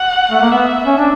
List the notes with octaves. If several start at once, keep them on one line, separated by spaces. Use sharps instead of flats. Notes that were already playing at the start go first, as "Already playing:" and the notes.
Already playing: F#5
A3
A#3
B3 E5
C#4
D4